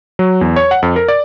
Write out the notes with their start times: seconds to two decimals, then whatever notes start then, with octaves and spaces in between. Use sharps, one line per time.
0.19 F#3
0.41 E2
0.56 C#5
0.71 F#5
0.82 F2
0.96 A#4
1.08 D5